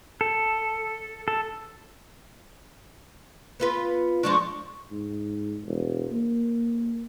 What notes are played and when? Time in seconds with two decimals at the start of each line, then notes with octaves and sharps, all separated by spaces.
0.21 A4
1.28 A4
3.60 B3 F4 B4
4.23 F3 G#3 D4 C#6
4.92 G#2
5.65 E1
6.12 A#3